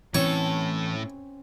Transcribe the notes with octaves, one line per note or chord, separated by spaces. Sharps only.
A2 E3 C4 C#4 A4 C#5